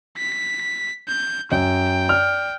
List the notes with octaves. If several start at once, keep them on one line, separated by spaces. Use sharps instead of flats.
B6
G6
F#2 G5
D5 F6